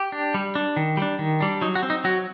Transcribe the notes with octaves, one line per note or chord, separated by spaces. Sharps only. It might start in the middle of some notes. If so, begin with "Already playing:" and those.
Already playing: G4
D4
G3
D4
D#3
G3 D4
D#3
G3 D4
F#3 D#4
F#4
C4
D#4
F#3 F#4